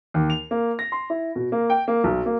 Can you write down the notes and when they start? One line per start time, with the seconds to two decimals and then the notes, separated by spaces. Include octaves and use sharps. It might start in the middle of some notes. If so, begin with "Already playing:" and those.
0.14 D#2
0.30 F7
0.51 A#3
0.79 A#6
0.92 C6
1.10 E4
1.36 B2
1.52 A#3
1.70 G5
1.88 A#3
2.04 B1
2.26 A#3